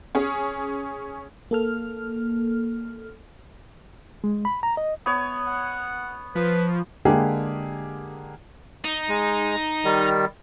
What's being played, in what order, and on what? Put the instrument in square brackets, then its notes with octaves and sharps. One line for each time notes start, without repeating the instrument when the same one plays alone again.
[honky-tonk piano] C#4 G#4
[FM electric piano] A#3 A4 F6
[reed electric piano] G#3
B5
A#5
D#5
[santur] B3 C#5
[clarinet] F#5
[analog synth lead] F3 [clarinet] B4
[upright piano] D3 G#3 A#3 G4 G#4
[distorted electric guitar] D#4
[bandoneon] G#3
D#3 G3